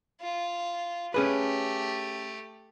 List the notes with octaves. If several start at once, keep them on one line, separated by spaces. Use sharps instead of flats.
F4
A3 C#4 G4 G#4 B4